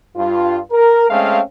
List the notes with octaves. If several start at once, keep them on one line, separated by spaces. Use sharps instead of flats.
G2 F4
A#4
G#3 A3 C4 C#4 F5